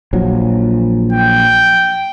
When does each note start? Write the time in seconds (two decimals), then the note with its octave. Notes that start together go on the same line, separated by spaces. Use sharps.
0.13 A#1 F3 F#3
1.12 G5